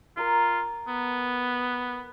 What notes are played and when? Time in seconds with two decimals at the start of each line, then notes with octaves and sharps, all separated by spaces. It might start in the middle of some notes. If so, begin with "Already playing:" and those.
0.17 F4 A#4 A#5 D#6
0.88 B3